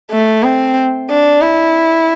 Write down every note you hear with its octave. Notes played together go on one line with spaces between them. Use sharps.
A3
C4
D4
E4